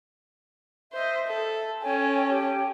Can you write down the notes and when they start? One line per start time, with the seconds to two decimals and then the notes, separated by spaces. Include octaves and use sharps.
0.93 C5 D#5 E5
1.27 A4
1.82 C#4 A4 C#5 G5 G#5
2.28 G4 G5